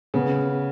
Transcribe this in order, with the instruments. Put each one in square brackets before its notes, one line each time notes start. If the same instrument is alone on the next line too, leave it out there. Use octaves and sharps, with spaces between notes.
[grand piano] C#3 [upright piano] B3